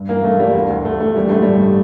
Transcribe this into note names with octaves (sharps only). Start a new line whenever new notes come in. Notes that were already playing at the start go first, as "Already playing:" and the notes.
Already playing: G2
E3 A#3
G2 A3
G1 G3
D2
D2
D2 A3
E3 A3
D3 G3
A1 A3
G2 G3